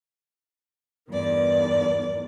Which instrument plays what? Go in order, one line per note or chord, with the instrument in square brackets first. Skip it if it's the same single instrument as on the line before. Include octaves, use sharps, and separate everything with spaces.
[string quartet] E2 G2 D#3 D5